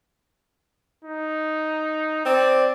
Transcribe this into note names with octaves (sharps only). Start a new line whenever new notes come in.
D#4
C4 D5